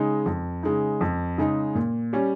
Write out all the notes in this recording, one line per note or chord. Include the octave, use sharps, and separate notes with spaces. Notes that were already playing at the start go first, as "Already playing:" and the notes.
Already playing: C#3 G#3 D#4
F2
C#3 G#3 D#4
F2
C#3 G#3 D#4
A#2
G3 C#4